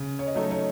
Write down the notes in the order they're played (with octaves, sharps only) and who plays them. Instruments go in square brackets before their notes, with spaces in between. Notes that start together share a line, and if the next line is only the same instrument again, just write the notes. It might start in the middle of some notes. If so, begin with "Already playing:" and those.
Already playing: [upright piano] C#3
[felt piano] C#5
D#5
[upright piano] F#3 A3 D#4 A4 [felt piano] C#5
[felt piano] C#5